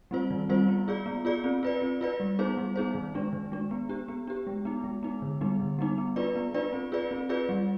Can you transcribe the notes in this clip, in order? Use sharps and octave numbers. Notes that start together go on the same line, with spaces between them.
G3 C4 F4 C5
D#3
G3 C4 F4 C5
B3
F4 G#4 D5
B3
F4 G#4 D5
C4
F4 B4 D5
C4
F4 B4 D5
G3
B3 D#4 G#4 C5
G3
B3 D#4 G#4 C5
D#3
G#3 D4
D#3
G#3 D4
B3
D4 G4
B3
D4 G4
G#3
B3 D#4
G#3
B3 D#4
D3
G3 B3 D#4
D3
G3 B3 D#4
B3
D4 F4 B4 D5
B3
D4 F4 B4 D5
C4
F4 G#4 B4 D5
C4
F4 G#4 B4 D5
G3